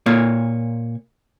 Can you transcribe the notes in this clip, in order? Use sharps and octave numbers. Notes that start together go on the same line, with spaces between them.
A#2 A#3 C#5